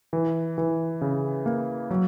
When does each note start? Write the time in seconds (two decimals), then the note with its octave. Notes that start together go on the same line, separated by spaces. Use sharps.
0.13 E3
0.58 E3
1.01 C#3
1.46 A#3
1.90 F#3